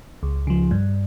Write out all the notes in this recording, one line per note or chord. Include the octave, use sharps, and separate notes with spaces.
C#2
C#3 F3
G2